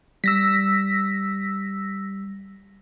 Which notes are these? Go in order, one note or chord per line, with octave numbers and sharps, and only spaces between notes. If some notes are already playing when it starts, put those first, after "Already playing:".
G3 E6 A#6 B6